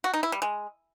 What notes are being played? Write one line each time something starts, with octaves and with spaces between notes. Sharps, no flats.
F#4
D#4
E4
G3
G#3